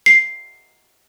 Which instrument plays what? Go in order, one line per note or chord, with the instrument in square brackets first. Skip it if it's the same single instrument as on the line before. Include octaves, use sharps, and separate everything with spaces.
[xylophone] C7